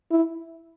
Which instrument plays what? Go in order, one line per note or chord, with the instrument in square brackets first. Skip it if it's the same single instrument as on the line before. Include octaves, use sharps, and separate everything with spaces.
[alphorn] E4